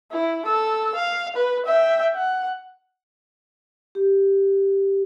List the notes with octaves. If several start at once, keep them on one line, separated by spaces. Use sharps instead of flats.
E4
A4 E6
F5
B4
E5 G5
F#5
G4